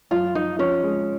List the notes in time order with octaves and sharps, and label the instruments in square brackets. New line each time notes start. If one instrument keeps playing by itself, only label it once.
[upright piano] F#2 [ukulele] F4
[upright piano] F3 [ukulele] D#4
[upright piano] F3 [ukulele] C#4
[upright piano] G#3